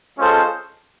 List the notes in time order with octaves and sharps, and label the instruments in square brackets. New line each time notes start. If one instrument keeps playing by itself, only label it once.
[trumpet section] G#3 C#4 F4 A4 C5